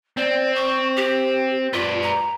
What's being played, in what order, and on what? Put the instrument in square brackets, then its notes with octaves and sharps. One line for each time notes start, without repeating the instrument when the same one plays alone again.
[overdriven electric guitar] C4 [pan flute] D5
[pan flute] C#6
G4
[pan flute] F4 [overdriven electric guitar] B4 D5
[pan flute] A#5